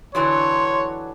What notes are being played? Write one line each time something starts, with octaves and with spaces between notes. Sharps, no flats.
D3 E3 F#3 C#5 C6